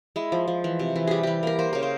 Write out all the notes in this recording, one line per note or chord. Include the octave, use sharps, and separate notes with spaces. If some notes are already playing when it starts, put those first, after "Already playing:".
G#3 E4
F3
F3
E3
C3
E3
G3 G4 G#4
E3 G4
A#3 A#4
A#3 C5
C#3 A#4
C5